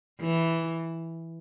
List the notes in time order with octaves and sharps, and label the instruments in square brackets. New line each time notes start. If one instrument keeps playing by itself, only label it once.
[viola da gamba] E3